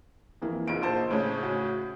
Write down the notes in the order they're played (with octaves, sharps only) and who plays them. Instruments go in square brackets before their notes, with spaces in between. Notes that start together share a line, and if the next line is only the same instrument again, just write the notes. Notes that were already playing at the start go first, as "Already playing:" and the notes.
[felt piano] F2 E3 A#3
[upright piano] F#1 D7 [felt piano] D#4 F4 G#4
[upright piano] A#1 C5 A5
A2 C#3
[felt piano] F#4 F#5 G#5